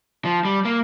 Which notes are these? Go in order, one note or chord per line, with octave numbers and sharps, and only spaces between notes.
F3
G3
A#3